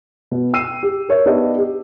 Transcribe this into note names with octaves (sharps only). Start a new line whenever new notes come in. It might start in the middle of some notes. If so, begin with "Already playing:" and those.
B2
G5 E6 C7 D#7
G4
A#4 C#5 E5
B3 D4 D#4 G4 D5 D#5
G4